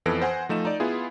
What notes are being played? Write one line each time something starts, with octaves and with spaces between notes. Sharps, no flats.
F2 E3 B3 A4 A#6 D7
C5 F#5 G#5
F3 A3 D#4 E7
D#4 D5
B3 E4 F4 G#4